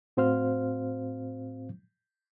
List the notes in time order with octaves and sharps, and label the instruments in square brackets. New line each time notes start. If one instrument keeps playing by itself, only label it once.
[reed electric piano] A2 C4 F#4 C5 F5 F6